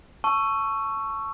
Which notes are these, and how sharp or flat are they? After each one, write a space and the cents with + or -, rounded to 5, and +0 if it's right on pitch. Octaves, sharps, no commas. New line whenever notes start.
A5 +0 C#6 +0 E6 +20